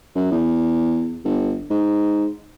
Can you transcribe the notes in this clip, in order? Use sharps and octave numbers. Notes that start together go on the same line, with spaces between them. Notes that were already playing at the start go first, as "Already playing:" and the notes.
F#2
E2
G1
G#2